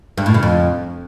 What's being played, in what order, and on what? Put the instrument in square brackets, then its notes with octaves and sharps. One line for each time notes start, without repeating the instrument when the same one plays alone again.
[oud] G2
A2
C#3
F2